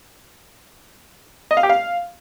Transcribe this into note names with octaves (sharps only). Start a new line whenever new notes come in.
D#5
F5
G4
F5